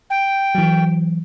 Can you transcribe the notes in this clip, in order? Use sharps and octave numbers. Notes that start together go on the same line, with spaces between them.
G5
E3 F#3